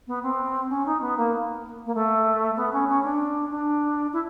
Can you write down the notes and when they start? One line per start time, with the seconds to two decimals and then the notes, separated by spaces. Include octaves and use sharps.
0.07 B3
0.23 C4
0.69 C#4
0.85 D#4
1.01 B3
1.17 A#3
1.86 A#3
1.95 A3
2.56 B3
2.72 C#4
2.88 C#4
3.03 D4
3.51 D4
4.13 E4